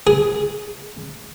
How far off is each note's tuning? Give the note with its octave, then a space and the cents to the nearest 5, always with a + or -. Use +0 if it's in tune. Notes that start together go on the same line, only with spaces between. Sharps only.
G#4 +5